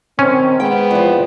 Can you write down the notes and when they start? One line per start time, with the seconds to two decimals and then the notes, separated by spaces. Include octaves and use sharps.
0.19 D#3 C4 C#4
0.60 G#3 B3 G5
0.91 E2 F3